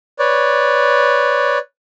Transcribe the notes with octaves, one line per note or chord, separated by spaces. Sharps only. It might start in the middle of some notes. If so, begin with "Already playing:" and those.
B4 C#5 D5